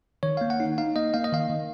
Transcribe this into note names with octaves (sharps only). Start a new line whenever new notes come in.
D#3 C#5
A#3 F5
F#5
D#4
D#4 F5
A#3 D#5
A#3 F5
D#5
D#3 F5
D#3